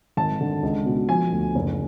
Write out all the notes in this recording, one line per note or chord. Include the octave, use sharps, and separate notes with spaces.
G#1 A5
D3
C#2
B2
F3 G#5
D2
F#1